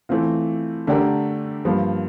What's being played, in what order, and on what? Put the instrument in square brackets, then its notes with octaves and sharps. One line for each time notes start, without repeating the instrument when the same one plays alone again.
[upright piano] E3 A3 C4 F4
D3 A3 D4 G4 A#4
G2 F3 A#3